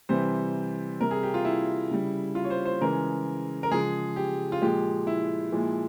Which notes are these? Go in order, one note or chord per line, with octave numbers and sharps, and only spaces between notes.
C3 E3 G3 C5
C3 G3 A#4
G#4
G4
F4
E4
C#3 G3
F4
C#5
C5
C5
C#3 E3 G#3 A#4
A#4
C#3 F3 G#3 G#4
G4
F4
A#2 F3 G#3 G4
E4
A#2 F3 G#3